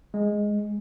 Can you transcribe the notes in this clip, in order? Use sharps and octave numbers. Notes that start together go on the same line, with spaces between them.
G#3